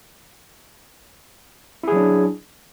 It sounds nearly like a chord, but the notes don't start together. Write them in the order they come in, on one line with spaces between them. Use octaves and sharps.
E4 G#4 F#3 D4